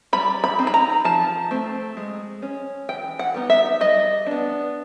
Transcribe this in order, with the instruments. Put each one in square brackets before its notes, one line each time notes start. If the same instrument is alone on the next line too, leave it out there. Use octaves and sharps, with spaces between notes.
[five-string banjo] G3 B5
B5
C4 D#4
B5
A#5
F3 A5
A3 C4
G#3
C#4
E3 G5
F#5
G3 B3 D#4
E5
G3 D#5
B3 D4